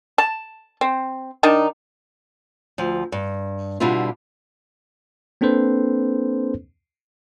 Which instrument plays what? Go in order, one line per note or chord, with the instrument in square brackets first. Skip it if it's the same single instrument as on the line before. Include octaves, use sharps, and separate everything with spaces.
[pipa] A5
C4
D#3 D4 D#4
[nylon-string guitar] D2 F3
G2
B2 D3 G3 D4 E4 F4
[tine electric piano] A#3 C4 D4 A4 B4 C5